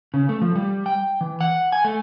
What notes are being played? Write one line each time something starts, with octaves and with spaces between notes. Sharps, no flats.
C#3
A3
F3
G3
G5
E3
F#5
G#5
A3